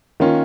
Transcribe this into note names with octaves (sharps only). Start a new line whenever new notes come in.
D#3 A#3 C#4 F4